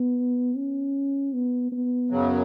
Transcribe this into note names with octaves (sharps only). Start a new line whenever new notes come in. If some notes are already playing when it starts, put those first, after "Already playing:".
Already playing: B3
C#4
B3
B3
F#2 C#3 F#3